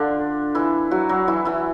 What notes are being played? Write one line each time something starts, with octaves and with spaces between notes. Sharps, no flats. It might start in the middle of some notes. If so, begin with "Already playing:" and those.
Already playing: D3 D4 F4
E3 E4
F#3 F#4
F#3 F#4
E3 E4
E3 E4